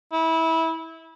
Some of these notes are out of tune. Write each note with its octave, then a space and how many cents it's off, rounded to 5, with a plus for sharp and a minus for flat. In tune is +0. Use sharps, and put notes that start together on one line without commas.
E4 -20